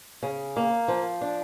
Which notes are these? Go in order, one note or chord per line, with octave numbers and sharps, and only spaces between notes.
C#3
A#3
F3
D4